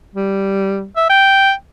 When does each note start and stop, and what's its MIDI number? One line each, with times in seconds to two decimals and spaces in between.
0.15 0.86 55
0.96 1.05 76
1.10 1.53 79